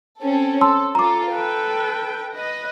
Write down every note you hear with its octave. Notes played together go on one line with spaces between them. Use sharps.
C4 C#4 A4
A4 A5 C6 E6
F4 A4 A#5 D6
A4 B4 G5
B4 D#5